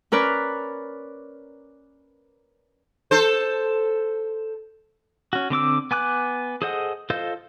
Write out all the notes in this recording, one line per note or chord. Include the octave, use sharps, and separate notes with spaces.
C#4 A#4 B4 D5
A4 C5
C#4 F#4
D3 C4 D6 E6
B3 G#5 D6 F#6
G#4 A4 C5 D#5 F#5
F4 A4 C5 D#5 F5